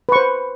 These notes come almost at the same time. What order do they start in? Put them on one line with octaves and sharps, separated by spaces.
B4 C#6 C5